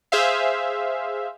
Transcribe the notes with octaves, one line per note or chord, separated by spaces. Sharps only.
G#4 C5 E5 F5